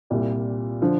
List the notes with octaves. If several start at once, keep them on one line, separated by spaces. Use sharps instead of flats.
C2 A#2 G3
D3 F3